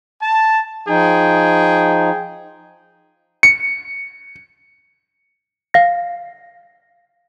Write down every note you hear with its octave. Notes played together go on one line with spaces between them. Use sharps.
A5
F3 D#4 G#4 G5
C#7
F5 A#6